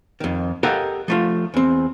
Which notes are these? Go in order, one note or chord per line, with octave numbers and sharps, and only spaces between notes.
F2 D#3
G4 A4 A#4 D#5 F5 F#5
F3 A3 F4
E2 C4